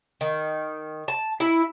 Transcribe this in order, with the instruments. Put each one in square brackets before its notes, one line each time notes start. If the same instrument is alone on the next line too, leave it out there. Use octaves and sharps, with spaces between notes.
[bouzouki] D#3
A5
E4